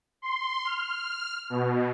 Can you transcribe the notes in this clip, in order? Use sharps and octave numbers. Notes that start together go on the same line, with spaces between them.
C6
F6
B2